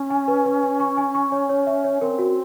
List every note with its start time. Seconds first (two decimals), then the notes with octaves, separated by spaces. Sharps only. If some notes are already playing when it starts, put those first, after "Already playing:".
Already playing: C#4
0.10 G#5
0.28 B4
0.45 B4
0.63 G#5
0.80 C#6
0.97 G#5
1.15 C#6
1.32 C#5
1.49 C#5
1.67 E5
1.84 C#5
2.01 C4 A#4
2.19 F#4